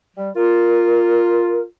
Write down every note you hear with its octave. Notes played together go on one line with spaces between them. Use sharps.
G3
F4 A#4